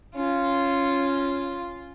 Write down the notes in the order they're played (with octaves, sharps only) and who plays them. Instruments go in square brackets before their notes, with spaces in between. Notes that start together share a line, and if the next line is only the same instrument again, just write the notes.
[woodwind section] C#4 [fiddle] F4